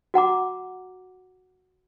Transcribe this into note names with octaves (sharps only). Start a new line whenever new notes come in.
F#4 F#5 A#5 D6